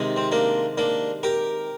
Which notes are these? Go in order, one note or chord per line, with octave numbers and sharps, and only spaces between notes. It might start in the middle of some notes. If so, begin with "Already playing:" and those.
Already playing: C3 D#3 G#3
C4
A#3 D4
A#3 D4
G4 A#4